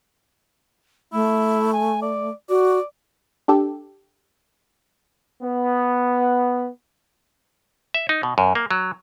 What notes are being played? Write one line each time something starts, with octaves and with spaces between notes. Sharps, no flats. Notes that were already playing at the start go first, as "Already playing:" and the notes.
A3 E4
G#5
D5
F#4 D5
D4 G4 A4
B3
E5
D#4
B2
F#2
A#3
F#3